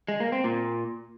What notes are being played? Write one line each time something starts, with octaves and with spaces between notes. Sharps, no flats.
G#3
A#3
C4
A#2